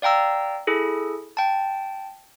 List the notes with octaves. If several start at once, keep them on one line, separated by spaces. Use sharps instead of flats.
D5 F5 G5 A#5 E6
E4 G#4 A4
G5 A5